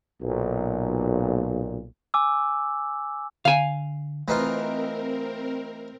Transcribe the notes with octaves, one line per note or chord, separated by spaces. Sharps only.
B1 A#2
G#5 D6 E6
D3 F5 G#5
E3 A3 C4 D#4 F4 A#4 C5